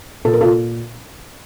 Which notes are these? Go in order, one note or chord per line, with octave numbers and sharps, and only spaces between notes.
A#2 A4
A#4
F4 A4
A#2